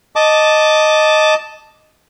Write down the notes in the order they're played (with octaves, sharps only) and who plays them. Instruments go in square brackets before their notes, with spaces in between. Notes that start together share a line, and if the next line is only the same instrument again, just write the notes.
[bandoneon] D#5 A5 D6